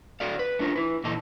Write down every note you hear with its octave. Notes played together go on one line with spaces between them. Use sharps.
F#4 A4 D5 F5
B4
A3 D4 F4 A#4
E4 B4
A#2 E3 D#4 A4